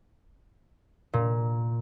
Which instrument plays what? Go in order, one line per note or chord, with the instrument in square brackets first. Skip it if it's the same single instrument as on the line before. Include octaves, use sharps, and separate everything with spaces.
[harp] A#2